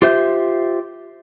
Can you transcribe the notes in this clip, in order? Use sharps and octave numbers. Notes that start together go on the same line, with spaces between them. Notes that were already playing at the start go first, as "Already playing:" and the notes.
F4 G4 C5 E5 G6